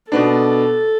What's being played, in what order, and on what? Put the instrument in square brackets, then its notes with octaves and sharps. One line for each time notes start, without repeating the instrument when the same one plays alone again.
[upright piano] B2 B3 D4 [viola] A4